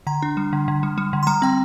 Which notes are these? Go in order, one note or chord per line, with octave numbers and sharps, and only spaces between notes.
D3 A#5
D4
G3
D3
D3
G3
G3
D3
C6
G3 A#5
C4 G5